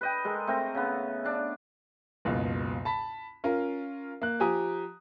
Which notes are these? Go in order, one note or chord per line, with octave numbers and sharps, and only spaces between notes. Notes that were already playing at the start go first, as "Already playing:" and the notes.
B4 D#5 G5
G#3 A4 A#4
A3 C4 A#4 A#5
C#3 B3
D4 A5
F#1 C#2 B2
A5 B5 B6
C#4 F4 A#4
A#3 F#6
F3 G4 G#5 A#5 D#6